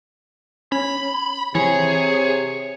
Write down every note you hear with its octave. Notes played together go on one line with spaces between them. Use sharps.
C#4 B5
C3 E3 G#4 C#5